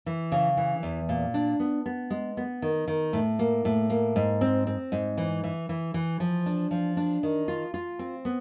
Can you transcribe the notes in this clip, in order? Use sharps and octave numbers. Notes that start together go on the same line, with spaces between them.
E3
C#3
E3
E2
A#2
D4
B3
B3
G#3
B3
D#3
D#3
A2
A#3
A2
A#3
G#2
C4
C4
G#2
E3
E3
E3
E3
F3
D4
F3
D4
D#3
F4
F4
C4
B3